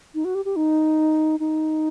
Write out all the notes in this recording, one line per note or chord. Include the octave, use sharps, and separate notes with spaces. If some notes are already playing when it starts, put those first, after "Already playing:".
D#4
F#4
G4
G4
D#4
D#4